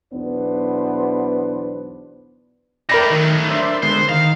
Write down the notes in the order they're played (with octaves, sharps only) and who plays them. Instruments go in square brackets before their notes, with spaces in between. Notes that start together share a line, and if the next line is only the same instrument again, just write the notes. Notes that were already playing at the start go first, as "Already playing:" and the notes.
[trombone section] B1 E2 B3 D4 B4 C5
[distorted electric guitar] A3 D#4 [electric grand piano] A#4 B5 A#6 [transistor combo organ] D5 G5
[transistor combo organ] D#3 [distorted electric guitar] F#3 A3
[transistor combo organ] D4 C5 E5
[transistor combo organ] D3 G#3 B3 [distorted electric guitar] C5
[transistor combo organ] D#3 [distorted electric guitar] F5